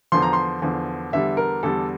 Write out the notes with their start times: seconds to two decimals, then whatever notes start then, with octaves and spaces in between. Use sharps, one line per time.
0.12 E2 D3 F3 C6
0.22 A#5
0.33 C6
0.62 E2 D3 F3
1.13 E2 D3 G3 E5
1.37 A#4
1.63 E2 D3 G3 A4